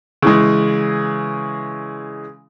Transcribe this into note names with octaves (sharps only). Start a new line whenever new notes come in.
C#3 E3 G#3